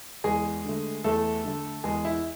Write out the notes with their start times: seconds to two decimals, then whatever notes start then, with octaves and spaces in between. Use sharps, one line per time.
0.24 E2 G#3 G#4
0.65 D3 A3
1.04 E2 A3 A4
1.44 D3 A3
1.84 E2 G#3 G#4
2.05 E4